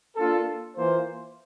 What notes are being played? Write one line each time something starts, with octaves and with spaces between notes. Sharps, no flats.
A#3 D4 F4 A4
E3 A#3 F4 C5